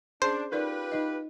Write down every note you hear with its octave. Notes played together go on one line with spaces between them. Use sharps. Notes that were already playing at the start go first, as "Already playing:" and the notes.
C#4 D4 G#4 C5 A5
D#4 F4 G4 A#4 B4 D5
D#4 D#5